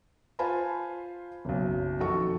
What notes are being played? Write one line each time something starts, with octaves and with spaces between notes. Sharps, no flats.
F4 C5 F5 G#5 A5 B5
F#1 B1
F2 D#3 D#4 F#4 A4 C#6